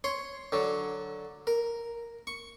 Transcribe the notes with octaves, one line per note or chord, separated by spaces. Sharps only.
C#5 C6
D3 F#3
A#4
C#6